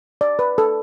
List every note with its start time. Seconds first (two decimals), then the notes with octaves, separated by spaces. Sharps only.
0.21 D5
0.39 B4
0.58 A4